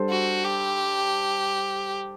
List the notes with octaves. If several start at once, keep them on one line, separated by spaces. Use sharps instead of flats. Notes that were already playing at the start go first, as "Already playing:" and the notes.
Already playing: G3 D4 A4 C5
F#4
G4